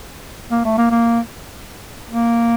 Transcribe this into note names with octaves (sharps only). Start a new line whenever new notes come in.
A#3
A3
A#3
A#3
A#3